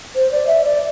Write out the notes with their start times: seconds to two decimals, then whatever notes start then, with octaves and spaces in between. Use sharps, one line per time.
0.15 C5
0.32 D5
0.47 E5
0.64 D5